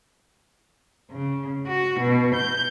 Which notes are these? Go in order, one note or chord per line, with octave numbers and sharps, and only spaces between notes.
C#3
F#4
B2
G6